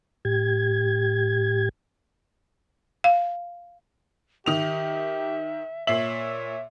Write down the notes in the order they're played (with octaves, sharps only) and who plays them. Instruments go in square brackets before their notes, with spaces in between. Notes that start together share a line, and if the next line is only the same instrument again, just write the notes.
[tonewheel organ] A2 G4 G#6
[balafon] F5
[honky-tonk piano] D#3 F7 [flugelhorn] G4 [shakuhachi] E5
[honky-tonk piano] A#2 C7 F#7 [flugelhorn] C#5 [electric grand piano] E5